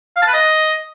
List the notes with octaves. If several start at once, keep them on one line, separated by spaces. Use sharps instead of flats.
F5
A5
B4
D#5